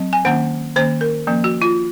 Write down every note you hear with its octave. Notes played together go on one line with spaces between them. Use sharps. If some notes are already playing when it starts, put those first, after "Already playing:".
Already playing: F#3 C4
G#5
D#3 A#3 C#4 F#5
D#3 A#3 C#4 C5
A#4
F3 A#3 C#4
F#4
F4